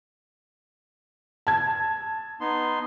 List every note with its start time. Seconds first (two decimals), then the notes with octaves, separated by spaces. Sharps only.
1.47 A5 G#6
2.41 B3 D#4 C6